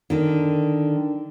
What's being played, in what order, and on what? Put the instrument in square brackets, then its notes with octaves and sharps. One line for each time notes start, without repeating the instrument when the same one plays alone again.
[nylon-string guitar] D3 D#3